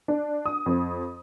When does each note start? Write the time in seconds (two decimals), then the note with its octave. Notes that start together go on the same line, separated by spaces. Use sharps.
0.08 D4
0.46 D#6
0.66 F2